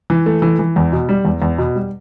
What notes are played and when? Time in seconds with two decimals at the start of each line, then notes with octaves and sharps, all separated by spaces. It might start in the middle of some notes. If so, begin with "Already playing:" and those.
0.10 E3
0.26 A3
0.42 E3
0.59 E3
0.76 E2
0.92 B2
1.09 G3
1.25 E2
1.42 E2
1.58 B2
1.75 G3